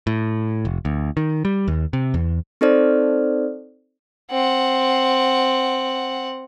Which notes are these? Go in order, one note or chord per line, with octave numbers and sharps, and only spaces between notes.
A2
F1
D2
D#3
G3
D#2
C3
E2
C4 D#4 A4 C5 D5 F6
C4 F#5